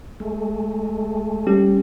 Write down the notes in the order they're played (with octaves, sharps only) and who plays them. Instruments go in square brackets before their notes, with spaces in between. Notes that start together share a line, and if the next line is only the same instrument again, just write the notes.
[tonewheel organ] G#3 A3
[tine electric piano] G3 C#4 G4